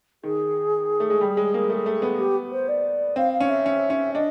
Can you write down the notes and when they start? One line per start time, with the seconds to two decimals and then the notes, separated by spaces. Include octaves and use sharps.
0.23 D#3 G#4
1.00 A3
1.10 G#3
1.21 G3
1.37 G#3
1.54 A#3
1.70 A3
1.86 A3
2.02 B3
2.19 G4
2.51 C5
2.68 D5
3.16 C4 F5
3.33 F5
3.40 C#4
3.49 E5
3.66 C#4
3.90 C#4
4.14 D4 D#5